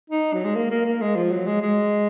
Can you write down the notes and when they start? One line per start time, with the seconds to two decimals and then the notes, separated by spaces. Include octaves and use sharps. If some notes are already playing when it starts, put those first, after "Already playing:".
0.10 D#4
0.34 F#3
0.45 G#3
0.55 A#3
0.71 A#3
0.86 A#3
1.01 G#3
1.16 F3
1.32 F#3
1.47 G#3
1.62 G#3